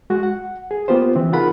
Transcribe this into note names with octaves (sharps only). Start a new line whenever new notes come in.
G#3 F#4
F#5
G#4
A#3 B3 F4 G4 C5
C#3 E3 C4
D#4 F4 G#4 A#4 F#5 B5